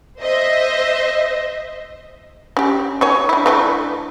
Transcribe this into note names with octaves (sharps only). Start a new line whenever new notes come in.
C5 D#5 E5
C#4 G4
D#3 C#5 G#5
D4 E4
E3 A3 D4